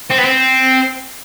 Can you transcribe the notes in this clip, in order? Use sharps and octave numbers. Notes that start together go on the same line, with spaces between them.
C4
B3
C4